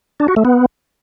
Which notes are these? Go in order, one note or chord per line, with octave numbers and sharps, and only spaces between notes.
D4
F#4
A3
B3